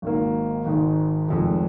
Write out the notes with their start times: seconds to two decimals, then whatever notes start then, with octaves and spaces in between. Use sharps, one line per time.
0.02 G#1 G#2 D#3 A#3
0.65 G#1 G#2 D#3 G#3
1.28 F1 F2 D#3 G#3